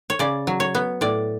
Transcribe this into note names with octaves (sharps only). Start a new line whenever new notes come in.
C#5
C#3 D5
F#3
C#5
B3
A2 D5